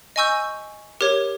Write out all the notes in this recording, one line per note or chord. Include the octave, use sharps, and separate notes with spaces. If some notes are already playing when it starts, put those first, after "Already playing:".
D#5 G#5 C#6 E6 G6
G4 A#4 C#5